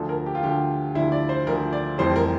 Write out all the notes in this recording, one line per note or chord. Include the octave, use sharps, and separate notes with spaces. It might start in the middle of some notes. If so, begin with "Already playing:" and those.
Already playing: D2 D3 F3 A4
A#4
G4
F4
D2 D3 F3 G4
D2 D3 F3 E4
D5
C5
D2 D3 F3 A#4
D5
F1 F2 E3 G3 C5
A#4